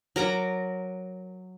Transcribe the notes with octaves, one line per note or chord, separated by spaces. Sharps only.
F#3 A#4 A#5 D6